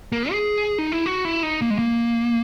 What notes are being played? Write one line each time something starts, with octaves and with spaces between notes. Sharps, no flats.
A#3
G#4
D#4
E4
F#4
E4
D#4
A#3
G#3
A#3